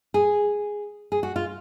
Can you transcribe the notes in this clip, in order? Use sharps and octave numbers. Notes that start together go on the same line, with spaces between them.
G#4
G#4
F#4
F4